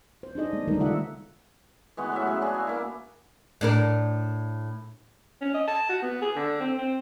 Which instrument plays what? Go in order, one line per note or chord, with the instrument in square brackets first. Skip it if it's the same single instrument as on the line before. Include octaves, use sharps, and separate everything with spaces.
[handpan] C5
D4 D#4 G#4 D#5
G#3 B3
D#3 G3 A3 D4 D#4 A#4
C#3 G#3 F4 E5 F#5
[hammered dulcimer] E3 G#3 B3 F#4
A2 F#3 F#4 E5
C#3 G#3 G#4
D4 E4 F#4 G#4
F5 G#5
A#3 E4
[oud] A2 D4 A#4
[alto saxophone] C#4
D#5
A5
F#4
B3
G#4
D3
C4
C4